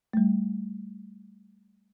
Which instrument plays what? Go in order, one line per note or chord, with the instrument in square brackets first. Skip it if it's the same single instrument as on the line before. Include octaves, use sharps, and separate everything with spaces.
[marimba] G3 A3